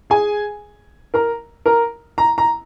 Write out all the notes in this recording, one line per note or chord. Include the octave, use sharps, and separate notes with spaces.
G#4 G#5
A#4 A#5
A#4 A#5
A#5
A#5